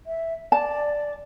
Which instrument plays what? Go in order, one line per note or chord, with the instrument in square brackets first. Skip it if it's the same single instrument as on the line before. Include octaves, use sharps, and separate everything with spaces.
[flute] E5
[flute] D5 [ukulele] A5